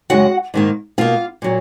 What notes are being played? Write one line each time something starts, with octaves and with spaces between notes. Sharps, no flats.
F#2 C#3 G#3 F#4 F#5
G#2 D#3 A#3
B2 A#3 F4 F5
A#2 F#3